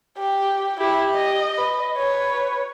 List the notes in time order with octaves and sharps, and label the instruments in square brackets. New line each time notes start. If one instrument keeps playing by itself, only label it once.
[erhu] G4
[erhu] E4 [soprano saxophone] G4
[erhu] D#5
[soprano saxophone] B4
[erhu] C#5